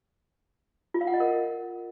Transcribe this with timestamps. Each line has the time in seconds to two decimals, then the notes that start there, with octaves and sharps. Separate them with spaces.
0.94 F4
1.01 F5
1.07 F#5
1.14 D#5
1.20 A#4